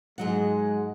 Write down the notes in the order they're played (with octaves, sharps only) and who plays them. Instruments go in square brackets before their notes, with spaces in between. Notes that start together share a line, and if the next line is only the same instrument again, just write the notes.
[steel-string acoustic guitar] G#2 F#3 F#5 [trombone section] G#3